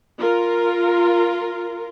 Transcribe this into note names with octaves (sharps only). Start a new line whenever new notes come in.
F4 A#4